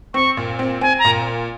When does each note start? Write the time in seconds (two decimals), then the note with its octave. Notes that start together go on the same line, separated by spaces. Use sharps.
0.14 C4 C#6
0.37 A#2
0.59 C4
0.81 C4 G#5
0.99 A#5
1.05 A#2